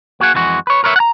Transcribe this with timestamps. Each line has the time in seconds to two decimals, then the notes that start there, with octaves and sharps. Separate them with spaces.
0.20 A#3 F#4 G#4 F#5
0.34 F2 E3 G#3 F#4
0.67 B4 C#5
0.84 A#4 B4 C#5 D#5 E5
0.96 F#5 A#5